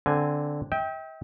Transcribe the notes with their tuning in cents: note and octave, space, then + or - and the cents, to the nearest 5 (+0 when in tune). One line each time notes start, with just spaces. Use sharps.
D3 -5 C4 +0 G#5 +0
E5 -45 G5 +0